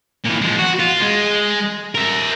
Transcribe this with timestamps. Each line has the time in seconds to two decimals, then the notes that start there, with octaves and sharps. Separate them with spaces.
0.25 A#2 E3
0.41 F3 G#3
0.59 F#4
0.79 F4
1.02 G#3
1.95 A#4 E5